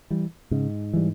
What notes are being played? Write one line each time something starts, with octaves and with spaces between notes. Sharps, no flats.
E3 G3
G#2 C#3
E3 G3